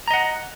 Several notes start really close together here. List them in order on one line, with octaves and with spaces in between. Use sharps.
A#5 D#5 F#5